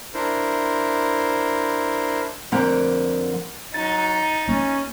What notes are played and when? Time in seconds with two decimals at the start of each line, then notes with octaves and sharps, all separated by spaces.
0.14 D4 E4 A#4 C5
2.52 F2 D3 F3 A#3 F#5 A#5
3.74 F#3 D#4 A6
4.48 A#3 C#4